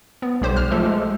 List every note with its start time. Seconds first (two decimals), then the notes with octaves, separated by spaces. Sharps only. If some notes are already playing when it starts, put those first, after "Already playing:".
0.22 B3
0.42 B1 G3 G4 C5
0.56 F6
0.71 F3 G#3 A3 G4 A4
0.86 G#3